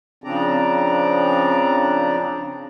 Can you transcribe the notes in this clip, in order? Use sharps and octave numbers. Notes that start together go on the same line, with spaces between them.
C#3 F3 C4 D4 D5 A#5